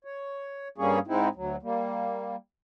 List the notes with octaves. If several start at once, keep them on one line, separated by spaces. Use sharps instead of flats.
C#5
G2 G3 A#3 C#4 G#4 C#5
G#2 G#3 C4 D#4 E4
D2 F#3
G3 A#3